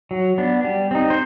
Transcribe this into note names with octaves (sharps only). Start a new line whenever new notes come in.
F#3
B3 D4
G3
C4 D#4
C5